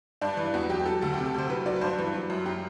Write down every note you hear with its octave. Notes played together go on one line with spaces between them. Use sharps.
G2 D4
E3
E2 F#4
F#3 G4
G4
F#3 A4
D2 A4
C3 G4
A4
D2 C5
F#3 B4
F#3 D5
B4
G2 C5
E3
F#3
F#2
F#3 G4